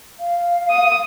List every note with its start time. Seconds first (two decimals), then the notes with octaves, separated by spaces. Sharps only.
0.20 F5
0.70 D#6